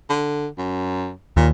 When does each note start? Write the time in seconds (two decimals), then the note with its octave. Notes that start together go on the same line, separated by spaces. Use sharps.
0.10 D3
0.58 F#2
1.37 D#2 A#2